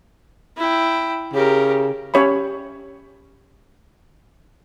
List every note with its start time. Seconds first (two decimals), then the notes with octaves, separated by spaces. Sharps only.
0.57 E4 G5
1.34 C#3 G4 A#4
2.14 C#4 G4 C#5 E5 B5